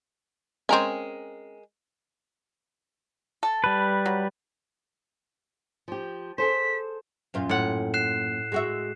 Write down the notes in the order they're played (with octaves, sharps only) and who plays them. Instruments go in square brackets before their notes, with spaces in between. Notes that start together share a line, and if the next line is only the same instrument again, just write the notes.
[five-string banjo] G#3 A#4 G#5 [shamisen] C4 C#4
[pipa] A4
[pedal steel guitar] G3 B4
[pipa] F#3
[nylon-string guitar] F3 G4
[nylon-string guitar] G#4 A4 C5 [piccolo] B6
[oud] F#2 A#2 F4
[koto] A2 F#5
[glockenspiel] F#6 C7 E7
[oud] G#3 F#4 E5